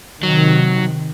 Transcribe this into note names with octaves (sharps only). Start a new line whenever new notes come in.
C3 D#3 F#3